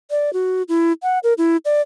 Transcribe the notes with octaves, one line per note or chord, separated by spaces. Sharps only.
D5
F#4
E4
F#5
A#4
E4
D5